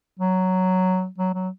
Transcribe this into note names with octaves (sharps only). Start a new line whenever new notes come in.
F#3
F#3
F#3